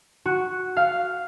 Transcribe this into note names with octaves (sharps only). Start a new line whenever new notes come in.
F#4
F5